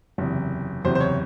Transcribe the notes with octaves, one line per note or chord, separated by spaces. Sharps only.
F#1 E2 C3
F#1 E2 C3 C5
C5
C#5